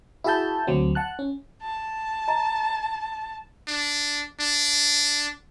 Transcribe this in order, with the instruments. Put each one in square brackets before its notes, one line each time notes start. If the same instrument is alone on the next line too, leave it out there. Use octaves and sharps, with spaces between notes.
[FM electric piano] E4 F#4 G#4 E5 A5 G6
D2 F#3 C4
F#5 A5 F#6
C#4
[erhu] A5
[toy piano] D#5 A#5
[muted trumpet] D4
D4